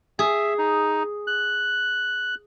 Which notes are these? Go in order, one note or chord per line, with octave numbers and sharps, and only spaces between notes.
G#4 E5
D#4
F#6